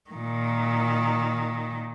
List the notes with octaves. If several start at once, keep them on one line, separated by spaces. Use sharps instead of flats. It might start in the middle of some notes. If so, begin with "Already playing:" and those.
A#2 D#3